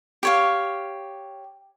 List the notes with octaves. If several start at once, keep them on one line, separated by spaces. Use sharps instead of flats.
G4 C#5 F5